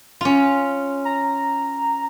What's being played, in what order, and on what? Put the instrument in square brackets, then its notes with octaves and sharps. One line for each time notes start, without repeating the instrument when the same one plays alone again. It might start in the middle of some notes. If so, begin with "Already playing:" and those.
[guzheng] C#4 F4
[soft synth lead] A#5